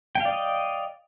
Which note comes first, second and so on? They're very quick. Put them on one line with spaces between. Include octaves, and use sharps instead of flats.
G5 F5 D5 D#5